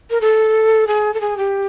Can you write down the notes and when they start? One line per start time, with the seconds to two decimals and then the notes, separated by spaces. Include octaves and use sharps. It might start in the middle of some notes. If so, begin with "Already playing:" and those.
0.11 A#4
0.21 A4
0.87 G#4
1.14 A4
1.21 G#4
1.37 G4